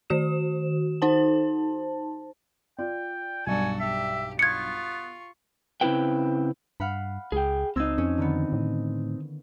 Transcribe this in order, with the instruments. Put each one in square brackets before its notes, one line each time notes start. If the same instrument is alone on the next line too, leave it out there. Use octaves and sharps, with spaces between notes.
[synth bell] D#3 F#4 E7
D#4 C5 A5
[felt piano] F4 D5 [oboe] G5
[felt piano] B1 G2 D5 [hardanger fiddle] F#4 A4 [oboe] G#5
[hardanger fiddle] G4 [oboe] E5
[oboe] B3 [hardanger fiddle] F4 C#6 [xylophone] G#6 C#7
[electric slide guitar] C#3 C4 E4 F#4 B4 G5
[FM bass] G2 [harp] F5 F#5 B5
[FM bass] C#2 [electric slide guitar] G#4 G5
[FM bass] C#2 [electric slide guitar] C4 D#4 [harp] E6 G#6 C7
[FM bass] F2 [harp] C#4
[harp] D3 D#3 B3
[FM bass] A2